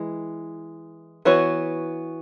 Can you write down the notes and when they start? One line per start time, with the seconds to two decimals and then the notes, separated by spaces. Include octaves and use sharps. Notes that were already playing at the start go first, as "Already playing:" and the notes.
Already playing: E3 G#3
1.25 E3 B3 F#4 C#5